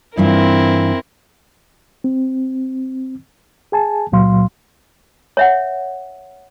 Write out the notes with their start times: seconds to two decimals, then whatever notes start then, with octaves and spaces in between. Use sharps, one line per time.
0.17 G2 E3 C4 E4 F4 A#4
2.04 C4
3.72 G#4 G#5 A5
4.12 C#2 A#2 F#3 F5 C6
5.37 C#5 E5 F#5